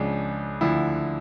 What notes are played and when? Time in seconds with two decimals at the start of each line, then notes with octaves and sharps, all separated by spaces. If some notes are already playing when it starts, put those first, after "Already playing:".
Already playing: C#2 C#3 F3 D4
0.61 D2 D3 F3 E4